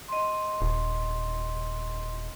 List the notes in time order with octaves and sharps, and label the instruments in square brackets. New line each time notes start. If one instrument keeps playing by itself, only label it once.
[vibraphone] D#5 C6
[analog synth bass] D#1